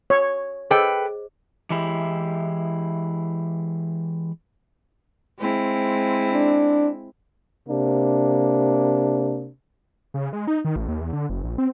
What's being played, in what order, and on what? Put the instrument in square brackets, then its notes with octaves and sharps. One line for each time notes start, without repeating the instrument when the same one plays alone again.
[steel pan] C#5
[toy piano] G#4 C5 D#5 [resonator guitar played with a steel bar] A4 B4 G5
[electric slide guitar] E3 G#3 E4 G4
[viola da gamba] G#3 C4 E4
[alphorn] D4
[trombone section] C3 A#3 D4
[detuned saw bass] C#3
G#3
D#4
D#3
A1
D#2
E2
D3
F#1
A#1
C4